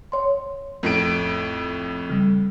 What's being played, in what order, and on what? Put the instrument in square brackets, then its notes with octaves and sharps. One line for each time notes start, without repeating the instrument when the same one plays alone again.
[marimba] C#5 C6
[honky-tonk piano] F2 A2 D7
[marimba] C#3 G3